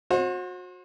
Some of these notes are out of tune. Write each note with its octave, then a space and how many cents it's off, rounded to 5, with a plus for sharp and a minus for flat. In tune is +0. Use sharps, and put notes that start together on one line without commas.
F#4 -30 C5 +35